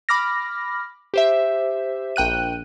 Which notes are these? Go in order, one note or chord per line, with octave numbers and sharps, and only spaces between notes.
B5 D6 F6 A#6
G4 C5 E5
A#1 G5 F#6 D#7